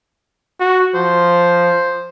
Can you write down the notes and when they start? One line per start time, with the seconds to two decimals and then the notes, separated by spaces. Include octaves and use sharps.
0.60 F#4
0.95 F3 C5